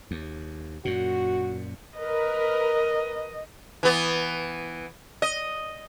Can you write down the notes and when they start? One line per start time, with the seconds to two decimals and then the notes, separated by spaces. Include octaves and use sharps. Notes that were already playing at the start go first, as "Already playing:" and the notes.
0.11 D#2
0.85 F#2 A#2 F#4
1.98 A#4 B4 D#5
3.83 E3 B3
5.22 D#5